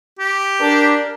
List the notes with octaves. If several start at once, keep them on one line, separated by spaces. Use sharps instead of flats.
G4
D4 A#4